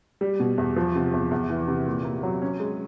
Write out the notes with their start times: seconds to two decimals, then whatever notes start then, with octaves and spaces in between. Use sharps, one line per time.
0.21 G3
0.40 B2
0.58 E2
0.76 F3
0.95 C3
1.14 E2
1.31 E2
1.50 E3
1.68 C3
1.87 A#2
2.04 A#3
2.23 F#3
2.42 C#4
2.60 G#3